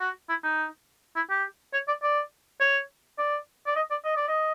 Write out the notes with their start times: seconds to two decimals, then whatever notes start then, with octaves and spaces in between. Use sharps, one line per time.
0.01 F#4
0.29 E4
0.44 D#4
1.16 E4
1.30 G4
1.73 C#5
1.88 D5
2.03 D5
2.60 C#5
3.18 D5
3.66 D5
3.76 D#5
3.91 D5
4.05 D#5
4.17 D5
4.28 D#5